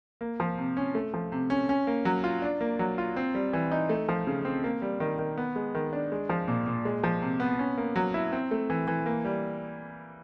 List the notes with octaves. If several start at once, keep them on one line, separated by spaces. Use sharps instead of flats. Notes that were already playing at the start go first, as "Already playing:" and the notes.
A#3
F3
C3
C#4
A3
F3
C3
C#4
C#4
A#3
F#3
F4
D4
A#3
F#3
F4
C4
G3
E3
D#4
A3
F3
C#3
C4
A#3
G3
D#3
D#3
B3
G#3
D#3
D4
G#3
F3
A#2
A#2
G#3
F3
C3
B3
C#4
A#3
F#3
E4
C4
A3
E3
E3
A#3
G3